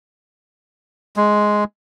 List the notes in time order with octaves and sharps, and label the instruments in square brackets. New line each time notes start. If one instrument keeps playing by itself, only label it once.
[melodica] G#3